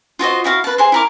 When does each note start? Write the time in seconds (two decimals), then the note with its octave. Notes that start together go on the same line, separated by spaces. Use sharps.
0.19 F4 F#4 C5 D#5
0.44 E4 F#4 F5
0.64 B4 A5
0.78 G#4 C5
0.92 E4 A#4 D6